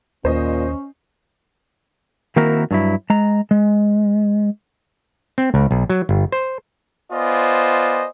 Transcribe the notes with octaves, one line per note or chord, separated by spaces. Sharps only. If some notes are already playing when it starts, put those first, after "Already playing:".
D#2 A#2 C#4 C5 D#5
D#3 A#3 C4 E4 F#4 A#4
G2 F#3 E4
G#3 A#5
G#3
C4
C#2
B1
F#3
G1
C5
B3 F4 C5 D5 D#5 G#5